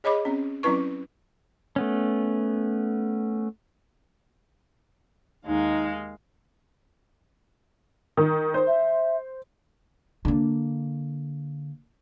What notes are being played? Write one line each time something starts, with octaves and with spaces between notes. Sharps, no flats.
G#4 C#5 D#5 B5 D6
C4 C#4
F#3 C4 C#4 E4 B4 C#6
A3 B3 C#4
D#2 G#3 D#4 F5
D#3
C5
E5
D3 A#3